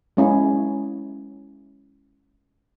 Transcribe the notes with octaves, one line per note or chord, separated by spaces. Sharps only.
G#3 C#4 E4